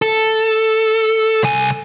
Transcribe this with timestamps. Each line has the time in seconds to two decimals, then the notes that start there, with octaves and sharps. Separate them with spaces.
0.02 A4
1.43 C2 G#5